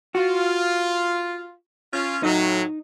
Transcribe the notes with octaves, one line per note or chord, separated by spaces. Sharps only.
F4 F#4
C#4 F4
A2 F#3 D#4